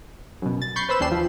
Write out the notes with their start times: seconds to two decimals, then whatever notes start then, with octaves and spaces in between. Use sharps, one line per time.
0.42 F#2 B2
0.62 A6
0.76 B5 C#6 G6 A6 C7
0.89 B4 C5 B5 E6 E7
1.00 D#2 C#4 D4 G4 C7 E7
1.11 F3